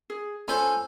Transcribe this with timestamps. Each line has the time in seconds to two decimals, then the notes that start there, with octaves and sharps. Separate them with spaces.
0.10 G#4
0.48 C#4 F4 A4 C5 G#5 B5